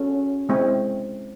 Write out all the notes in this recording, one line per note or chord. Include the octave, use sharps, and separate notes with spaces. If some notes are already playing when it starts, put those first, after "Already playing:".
Already playing: C#4 F#4 A4
G#3 C4 E4